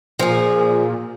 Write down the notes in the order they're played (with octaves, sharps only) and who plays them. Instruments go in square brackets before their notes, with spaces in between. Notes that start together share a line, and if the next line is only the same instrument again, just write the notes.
[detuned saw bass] A#2 [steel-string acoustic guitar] F3 G#4